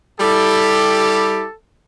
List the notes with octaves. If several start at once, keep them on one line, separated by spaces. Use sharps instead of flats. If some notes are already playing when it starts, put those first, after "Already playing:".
G3 E4 G4 A4